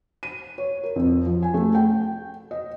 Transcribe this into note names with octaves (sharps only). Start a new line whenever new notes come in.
D#7
C#5
A#4
F2
F3
G#5
A3
G5
D#5